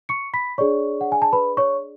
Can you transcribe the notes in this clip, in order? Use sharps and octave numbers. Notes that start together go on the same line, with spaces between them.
C#6 C#7
B5 B6
D4 G#4 C#5 D5 C#6
F#5
G#5
A5
B4 B5
C#5 C#6